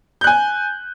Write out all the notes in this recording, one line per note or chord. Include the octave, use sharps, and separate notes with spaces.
G#5 F#6 G6